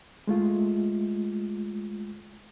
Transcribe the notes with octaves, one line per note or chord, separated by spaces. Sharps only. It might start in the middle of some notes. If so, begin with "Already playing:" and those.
G#3 A3 F4